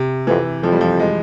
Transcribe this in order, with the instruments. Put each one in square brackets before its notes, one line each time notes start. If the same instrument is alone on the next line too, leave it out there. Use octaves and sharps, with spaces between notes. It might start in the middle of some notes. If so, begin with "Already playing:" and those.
Already playing: [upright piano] C3
[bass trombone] F2 [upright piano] E3
[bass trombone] F2 [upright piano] F3
[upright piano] G3
F3
G#3